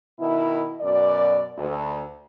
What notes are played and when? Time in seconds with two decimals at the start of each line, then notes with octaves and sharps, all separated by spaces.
0.19 B2 D#3 E4
0.81 F#2 B2 D5
1.58 D2